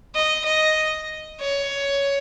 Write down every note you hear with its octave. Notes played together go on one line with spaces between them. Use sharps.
D#5
D#5
C#5